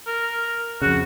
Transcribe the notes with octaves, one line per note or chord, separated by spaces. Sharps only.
A#4
F2 C#3 F#4